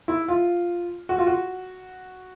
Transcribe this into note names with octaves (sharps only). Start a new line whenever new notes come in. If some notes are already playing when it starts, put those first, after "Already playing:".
E4
F4
F#4
F4
F#4